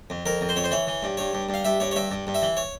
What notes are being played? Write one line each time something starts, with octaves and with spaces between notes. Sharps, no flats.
F2
F2 A#4
F2
C5
F2 C#5
C5
E3 C#5
E3
G2
G2 C#5
G2
G2
F5
G2 E5
G2 C#5
C#5
G2 E5
G2
G2
E5
E3
C#5